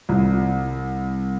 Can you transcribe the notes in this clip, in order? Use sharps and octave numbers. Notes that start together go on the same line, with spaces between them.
C2